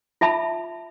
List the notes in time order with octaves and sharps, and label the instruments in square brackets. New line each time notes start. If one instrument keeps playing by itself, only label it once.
[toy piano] F4 E5 A5 B5